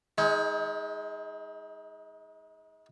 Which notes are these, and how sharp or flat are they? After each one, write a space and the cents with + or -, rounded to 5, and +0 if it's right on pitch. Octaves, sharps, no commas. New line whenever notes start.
G#3 +0 D#4 +40